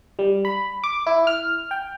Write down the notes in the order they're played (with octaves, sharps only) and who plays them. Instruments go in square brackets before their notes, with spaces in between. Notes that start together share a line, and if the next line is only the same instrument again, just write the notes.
[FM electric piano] G3
B5
D6
E4
F6
G5